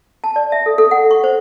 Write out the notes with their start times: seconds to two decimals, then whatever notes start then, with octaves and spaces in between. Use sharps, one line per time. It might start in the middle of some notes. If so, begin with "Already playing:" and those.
0.24 A5
0.36 D5
0.52 E5
0.66 A4
0.78 A4
0.91 F#5
1.11 C#6
1.24 C5